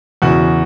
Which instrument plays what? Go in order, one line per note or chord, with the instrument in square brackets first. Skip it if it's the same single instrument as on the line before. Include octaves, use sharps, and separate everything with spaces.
[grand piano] E2 C#3 E3 F#4